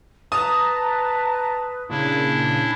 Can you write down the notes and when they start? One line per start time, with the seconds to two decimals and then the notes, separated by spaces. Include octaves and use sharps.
0.32 B4 A5 A#5 D#6
1.90 A#2 C#3 D4 E4 G#5